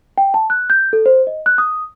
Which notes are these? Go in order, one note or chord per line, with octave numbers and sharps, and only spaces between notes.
G5
A5
F#6
G6
A4
C5
D#5
F#6
D#6